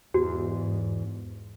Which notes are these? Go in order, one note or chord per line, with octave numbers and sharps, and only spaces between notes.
E2 G#2 F#4